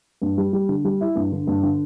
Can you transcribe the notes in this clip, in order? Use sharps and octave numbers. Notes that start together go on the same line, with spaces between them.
G2
G3
G3
D3
G3
E4
G2
D3
G2
D3